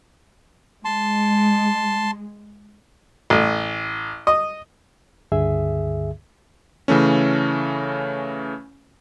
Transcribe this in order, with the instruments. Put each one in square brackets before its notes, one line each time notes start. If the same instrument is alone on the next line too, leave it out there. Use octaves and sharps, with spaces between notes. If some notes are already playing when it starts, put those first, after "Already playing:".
[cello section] G#3 [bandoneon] A5 C6
[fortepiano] A1
D#5
[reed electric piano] C#2 G2 D3 G#4 E5
[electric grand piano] C#3 E3 A3 C#4